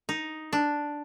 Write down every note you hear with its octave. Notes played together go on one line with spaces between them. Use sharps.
D#4
D4